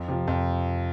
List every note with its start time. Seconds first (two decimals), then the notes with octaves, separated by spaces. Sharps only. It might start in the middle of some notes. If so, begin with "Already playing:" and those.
Already playing: F2
0.08 C3 F3
0.28 F2